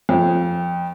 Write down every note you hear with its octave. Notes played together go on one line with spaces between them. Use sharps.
F2